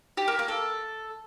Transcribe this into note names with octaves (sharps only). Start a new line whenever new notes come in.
G4
A#3
A#3
A4